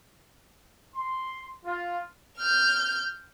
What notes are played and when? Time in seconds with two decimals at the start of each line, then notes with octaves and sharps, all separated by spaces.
0.96 C6
1.65 F4
2.38 F6 G6